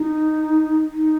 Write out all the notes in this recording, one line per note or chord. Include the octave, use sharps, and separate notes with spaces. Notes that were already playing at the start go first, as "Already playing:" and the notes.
Already playing: D#4
D#4